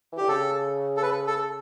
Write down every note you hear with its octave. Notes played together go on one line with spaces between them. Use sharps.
E3
D3 G4
C#3 A4
A4
B4
A4